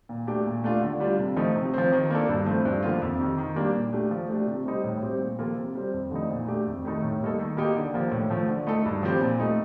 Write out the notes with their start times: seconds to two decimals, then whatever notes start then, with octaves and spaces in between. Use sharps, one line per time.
0.09 A#2
0.27 A3 D4 G4
0.46 A#2
0.64 A3 D4 F4
0.82 D3
1.00 G3 D4 F4
1.19 C3
1.36 F3 A3 D#4
1.56 C3
1.74 F3 C4
1.92 D#3
2.10 A#3 D4 A4
2.29 G2
2.46 F3 A3 C4
2.65 G2
2.83 D3 F3 A#3 F4
3.02 F2
3.19 C3 D#3
3.38 D#3
3.56 G3 A#3 D4
3.75 A#2
3.93 A3 D4 G4
4.11 F3
4.28 A3 D4 G4
4.47 C3
4.66 G3 C4 D#4
4.84 A2
5.02 G3 C4 G4
5.20 A#2
5.39 F3 A#3 F4 A4
5.57 C3
5.75 G3 C4
5.94 F2
6.11 D3 F3 A3 D#4
6.30 A#2
6.47 A3 D4 G4
6.67 F2
6.85 D#3 A3 D#4 A4
7.02 A2
7.21 G3 A#3 D#4 A4
7.39 D#3
7.57 A#3 D#4 G4
7.76 D3
7.94 F3 A#3
8.12 A2
8.30 F3 A3
8.48 D3
8.67 A3 D#4 A4
8.86 G2
9.03 F3 C4 G4
9.21 A#2
9.40 A3 D#4